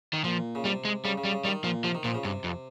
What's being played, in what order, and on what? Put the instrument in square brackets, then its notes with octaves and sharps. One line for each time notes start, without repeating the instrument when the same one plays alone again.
[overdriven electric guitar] D#3
[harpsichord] A#2 [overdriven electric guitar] F3
[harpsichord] C#3
[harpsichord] C3 [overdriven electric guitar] G3
[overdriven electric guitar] G#3
[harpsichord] C#3 [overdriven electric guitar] G3
[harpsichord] C#3
[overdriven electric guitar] G3
[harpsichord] C#3
[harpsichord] D#3 [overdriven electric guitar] G3
[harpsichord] A#2 [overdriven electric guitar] F3
[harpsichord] C3 [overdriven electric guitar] F3
[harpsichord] D#3
[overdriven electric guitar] A#2 [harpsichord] F3
[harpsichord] C#3
[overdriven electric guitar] G2 [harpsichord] C3
[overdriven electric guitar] F2